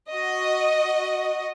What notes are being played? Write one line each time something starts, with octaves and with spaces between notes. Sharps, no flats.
F#4 D#5